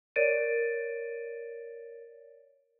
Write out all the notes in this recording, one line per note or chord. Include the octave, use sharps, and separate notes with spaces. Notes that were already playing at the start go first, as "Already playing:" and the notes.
A#4 C#5 D5 A6 D7 D#7